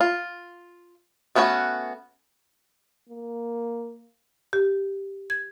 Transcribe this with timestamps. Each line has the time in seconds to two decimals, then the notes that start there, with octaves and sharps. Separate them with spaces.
0.01 F4
1.35 A3 B3 C#4 D4 F#4
3.09 A#3
4.53 G4
5.30 G#6